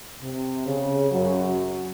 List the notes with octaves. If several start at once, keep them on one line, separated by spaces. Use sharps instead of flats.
C3
C#3
F#2 F#3